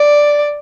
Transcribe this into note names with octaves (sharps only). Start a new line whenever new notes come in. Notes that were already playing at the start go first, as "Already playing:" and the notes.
Already playing: D5